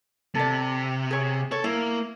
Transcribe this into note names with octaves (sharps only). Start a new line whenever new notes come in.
C3 A4 D5
G#4 C#5
A4 C#5
A#3 E4